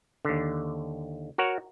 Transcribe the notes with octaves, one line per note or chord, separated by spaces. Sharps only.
D#2 D3
F#4 A#4 C#5 F#5